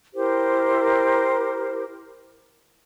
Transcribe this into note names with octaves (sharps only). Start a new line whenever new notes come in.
E4 G4 A#4 C5